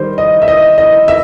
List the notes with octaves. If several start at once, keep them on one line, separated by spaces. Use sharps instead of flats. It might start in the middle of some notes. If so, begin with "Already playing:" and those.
Already playing: D#3 G3 C5
D#5
E5
D#5
D#5
E5